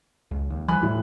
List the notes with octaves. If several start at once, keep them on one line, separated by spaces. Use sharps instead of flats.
C#2
D#2
E3 F3 G3 G#5 B5 F#6
A2